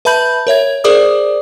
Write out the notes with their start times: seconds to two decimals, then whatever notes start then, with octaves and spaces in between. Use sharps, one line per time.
0.05 B4 E5 A5 B5 G6 F#7
0.47 A#4 C#5 E5 G#6
0.84 G#4 A#4 C5 D5 D6 D#6